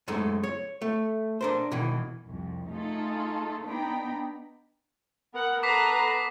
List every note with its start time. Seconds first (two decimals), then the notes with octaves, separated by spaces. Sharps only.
0.08 F#2 G#3 A3 D#4
0.43 C#5
0.82 A3
1.41 D4 A#4 C5
1.72 B2 D#3 E3
2.27 C2 F2
2.70 A3 D#4 F4 G#4 A4
3.66 B3 D4 D#4 G5 A#5 B5
5.34 B3 A#4 F#5
5.63 A4 B4 A#5 D6 B6 C7